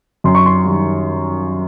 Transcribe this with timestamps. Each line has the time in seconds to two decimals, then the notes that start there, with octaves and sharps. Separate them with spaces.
0.24 F#2 C6
0.35 C#6
0.46 C6
0.65 D#3 G3